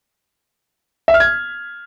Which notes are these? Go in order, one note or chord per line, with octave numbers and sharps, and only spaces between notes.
E5
F6
G#6